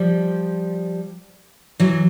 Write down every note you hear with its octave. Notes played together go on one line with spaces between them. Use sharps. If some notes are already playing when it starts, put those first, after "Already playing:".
Already playing: F3 G3
E3 F#3